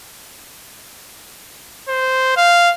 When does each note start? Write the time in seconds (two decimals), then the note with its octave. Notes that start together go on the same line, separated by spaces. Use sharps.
1.89 C5
2.37 F5